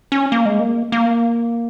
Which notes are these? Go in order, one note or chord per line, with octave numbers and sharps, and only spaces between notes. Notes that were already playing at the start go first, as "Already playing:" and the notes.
C#4
A#3
G#3
A#3
A#3